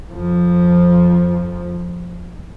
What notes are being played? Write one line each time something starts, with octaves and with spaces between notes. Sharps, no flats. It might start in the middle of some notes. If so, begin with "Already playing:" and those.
F2 F3